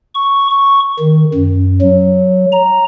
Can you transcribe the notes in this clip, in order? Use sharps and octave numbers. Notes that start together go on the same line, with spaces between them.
C#6
C#6
D#3
F#2
F#3
A#5